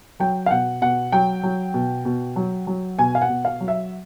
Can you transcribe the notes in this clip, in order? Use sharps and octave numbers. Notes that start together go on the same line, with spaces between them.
F#3 G5
F5
B2 F#5
B2 F#5
F#3 G5
F#3
B2
B2
F#3
F#3
B2 G#5
F5
F#5
B2
F5
F#3
E5